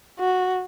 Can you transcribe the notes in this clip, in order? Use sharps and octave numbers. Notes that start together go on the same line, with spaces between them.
F#4